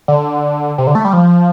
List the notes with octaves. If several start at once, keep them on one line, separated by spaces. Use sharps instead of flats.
D3
C3
D3
A3
G3
F3